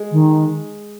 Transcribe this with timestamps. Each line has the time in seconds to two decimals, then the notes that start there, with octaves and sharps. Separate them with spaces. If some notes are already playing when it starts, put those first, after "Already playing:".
Already playing: G#3
0.12 D#3